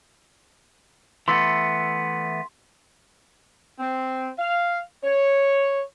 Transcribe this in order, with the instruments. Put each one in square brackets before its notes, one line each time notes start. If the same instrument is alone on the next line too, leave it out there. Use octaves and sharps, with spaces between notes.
[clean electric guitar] E3 A3 B3 [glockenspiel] C6
[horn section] C4
F5
C#5